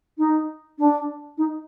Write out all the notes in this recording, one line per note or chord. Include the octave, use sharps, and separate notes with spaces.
D#4
D4
D#4